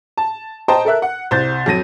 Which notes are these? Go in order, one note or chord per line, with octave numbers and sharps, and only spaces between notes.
A5
C5 D#5 G5 A5 A#5
A4 A#4 E5 F#6
F#5
C2 C5 G6 A6
F2 F#3 A#6 D#7